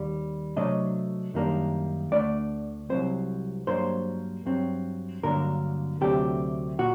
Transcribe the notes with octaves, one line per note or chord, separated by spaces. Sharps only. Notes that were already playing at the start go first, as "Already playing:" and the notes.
Already playing: D#2 D#3 G3
C3 F#3 A3 D4 D#5
F#2 D#3 G3 A#3 D4
D2 D3 A3 D4 D5
C2 C3 F#3 C4 C5
G2 F#3 A#3 D4 C5
G2 F#3 C4
G2 D3 F#3 A#3 D4 A#4
D2 C3 F#3 A3 D4 G4
A#2 F#4